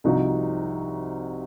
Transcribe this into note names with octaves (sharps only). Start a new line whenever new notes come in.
C2 C3 F3 D#4 F#4